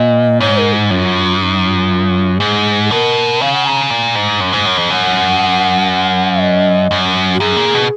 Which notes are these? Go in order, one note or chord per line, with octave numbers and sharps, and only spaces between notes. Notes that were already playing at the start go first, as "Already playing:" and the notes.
Already playing: A#2 D#5
G#2 C#5
A#4
D#4
F#2 F4
D#4
F4
G#2 G#4
G#4
B2 A#4
C#3 F5
F#5
A#5
A#2
G#2
F#2
G#2
F#2
F2
F#2 F#5
D#5
F#2
F#4
F#2 G#4
A#2
B2